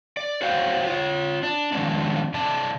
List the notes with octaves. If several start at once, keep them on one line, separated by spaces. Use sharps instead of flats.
D5
F#4 C5 C#5 F5 G5
F4 C#5
D4
D#3 F3 G#3 B3 C#4 D4
C3 D5 A5